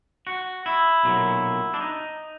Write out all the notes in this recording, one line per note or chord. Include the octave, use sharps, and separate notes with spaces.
F#4
E4
B1 A#2 F#3
D4
D#4